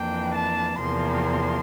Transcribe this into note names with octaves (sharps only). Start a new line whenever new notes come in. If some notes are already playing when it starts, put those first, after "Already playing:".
Already playing: F2 E3 A#3 D4 G5
A5
E2 C3 F3 A#3 C6